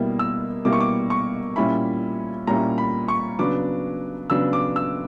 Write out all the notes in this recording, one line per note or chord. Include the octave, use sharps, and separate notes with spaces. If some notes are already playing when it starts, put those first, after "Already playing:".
Already playing: B2 G3 A#3 E4
E6
B2 G3 A#3 E4 D6
C#6
D6
C#6
A#2 G3 C#4 E4 B5
A#2 G3 C#4 E4 A#5
B5
C#6
C#3 F#3 B3 D4 D6
C#3 F#3 B3 D4 E6
D6
E6